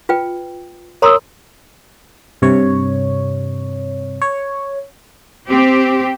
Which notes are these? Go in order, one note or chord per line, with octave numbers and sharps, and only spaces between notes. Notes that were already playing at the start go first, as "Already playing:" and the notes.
F4 B4 G5
A#4 C#5 A#5 C6 D#6 E6
G2 C3 C#5
C#5
C4 G4